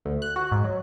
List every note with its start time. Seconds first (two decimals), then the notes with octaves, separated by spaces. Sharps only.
0.05 D2
0.22 F#6
0.36 F#4
0.51 G#2
0.64 F#3